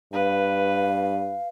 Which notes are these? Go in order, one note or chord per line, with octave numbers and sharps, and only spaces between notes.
G2 B4 F5